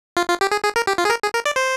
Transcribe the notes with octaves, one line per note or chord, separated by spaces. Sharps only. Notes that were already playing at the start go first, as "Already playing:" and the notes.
F4
F4
G4
G#4
G#4
A#4
G4
F4
G#4
A#4
G#4
A#4
D5
C5